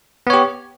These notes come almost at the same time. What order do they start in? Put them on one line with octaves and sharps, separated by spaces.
B3 C#5 G4